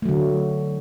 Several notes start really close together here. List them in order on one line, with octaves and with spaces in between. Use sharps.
A3 F#3 D3